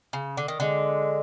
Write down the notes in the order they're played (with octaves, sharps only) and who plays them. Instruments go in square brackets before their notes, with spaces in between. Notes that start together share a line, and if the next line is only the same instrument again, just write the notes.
[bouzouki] C#3
D3
D#3
[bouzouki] D3 [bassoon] G#3